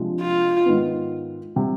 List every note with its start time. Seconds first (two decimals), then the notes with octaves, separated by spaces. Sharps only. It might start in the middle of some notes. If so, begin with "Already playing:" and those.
Already playing: C3 F3 G#3 D4
0.21 F4
0.66 G#2 D#3 B3
1.56 C3 G3